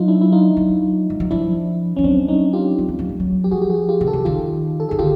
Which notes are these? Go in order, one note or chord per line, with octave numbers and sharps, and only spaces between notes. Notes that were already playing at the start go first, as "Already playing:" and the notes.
Already playing: F#3 D#4 F4
D4 E4
E4
D#4 F4
F#3
G3
F#3
F3 D4 E4
F3 C#4
F#3 C4 D4
C#4 D#4
F4 G4
F#3
G3
F#3
G3
F#3
G4
F3 F#4 G#4
G4
F#4 G#4
F4 G4
C#3
G4 A4
D3
D#3 F4 G4
A4
D#3 G#4
D3 F4 G4